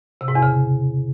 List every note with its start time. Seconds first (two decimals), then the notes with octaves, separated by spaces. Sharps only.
0.21 C3
0.28 G#2
0.35 E2
0.43 C#3